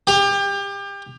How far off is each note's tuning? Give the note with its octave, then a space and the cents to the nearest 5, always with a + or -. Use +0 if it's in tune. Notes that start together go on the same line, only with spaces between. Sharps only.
G4 +30